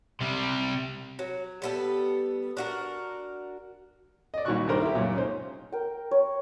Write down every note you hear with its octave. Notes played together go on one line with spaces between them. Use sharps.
C3 G3
F#3
G3 B3 A4
D4 F#4 A#4
D5 D#5
C2 A#2 D#3 F#4 C#6 F#6
G2 D#3 G3 A#4 C5
E4 G4
C#2 F#2 A#2
C#4 D#4 C5
A#4 G5
C#5